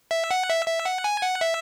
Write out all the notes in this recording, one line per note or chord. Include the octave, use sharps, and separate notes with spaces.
E5
F#5
E5
E5
F#5
G#5
F#5
E5